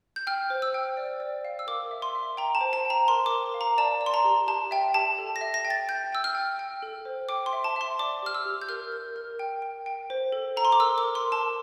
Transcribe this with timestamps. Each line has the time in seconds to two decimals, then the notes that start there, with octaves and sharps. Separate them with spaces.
0.16 G6
0.27 G5 F6
0.50 C5
0.62 E6
0.74 G5
0.97 D5
1.20 D5
1.45 F5
1.59 E6
1.67 A#4 D6
1.91 E5
2.02 C6
2.15 E5
2.37 G5 A#5
2.55 A5
2.61 C5
2.73 A5
2.85 G5
2.90 A#5
3.08 A#4 C6
3.26 A#4 D6
3.54 F5
3.61 A#5
3.78 D5 A5
4.01 D5
4.06 C6
4.14 A#5
4.25 G4
4.48 G4 A5
4.71 E5 G5
4.94 G4 A5
5.18 A4
5.36 A#6
5.41 E5
5.54 A#6
5.65 G5
5.70 A6
5.89 G5 G6
6.13 G5 E6
6.24 F6
6.35 G5
6.59 G5
6.82 A4
7.05 C5
7.29 G5 D6
7.46 C6
7.53 E5
7.64 A5
7.76 E5 C6
7.99 D5 D6
8.23 G4 F6
8.34 E6
8.46 G4
8.62 G6
8.69 A#4 F6
8.92 A#4
9.16 A#4
9.39 G5
9.62 G5
9.86 G5
10.10 C5
10.32 A4
10.57 A4 A#5
10.65 C6
10.72 D6
10.80 A#4 E6
10.98 D6
11.03 A#4
11.15 C6
11.27 A#4
11.32 A5